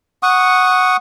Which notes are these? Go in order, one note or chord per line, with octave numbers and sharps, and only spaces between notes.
F#5 C#6 D#6